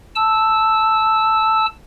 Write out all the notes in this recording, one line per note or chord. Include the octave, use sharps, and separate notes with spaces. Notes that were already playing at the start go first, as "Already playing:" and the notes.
A5 E6